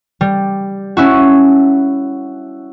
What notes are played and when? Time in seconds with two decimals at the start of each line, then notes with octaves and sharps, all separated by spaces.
0.21 G3
0.97 C#4 E4 F#4